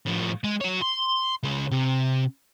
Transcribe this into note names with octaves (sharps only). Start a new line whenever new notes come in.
A2 F3
G#3
F#4 C#5
C6
C#3 G#3
C3